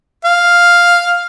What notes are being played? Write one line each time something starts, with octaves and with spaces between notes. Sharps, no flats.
F5